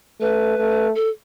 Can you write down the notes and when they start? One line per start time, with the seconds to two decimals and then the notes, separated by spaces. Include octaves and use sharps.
0.21 A3 B4
0.58 A3
0.95 A4